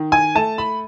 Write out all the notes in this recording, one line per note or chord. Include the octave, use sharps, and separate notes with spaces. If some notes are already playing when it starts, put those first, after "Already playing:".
Already playing: D#3
G#5
A3 A5
B5